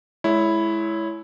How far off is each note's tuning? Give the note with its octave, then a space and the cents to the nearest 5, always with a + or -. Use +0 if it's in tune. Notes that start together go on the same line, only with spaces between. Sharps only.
G#3 +30 E4 +0 C#5 +15